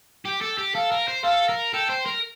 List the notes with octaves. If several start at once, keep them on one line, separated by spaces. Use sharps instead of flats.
G4 G5
A4
G4
A4 F5
A#4
C5
A4 F5
A#4
A4 G5
C5
A#4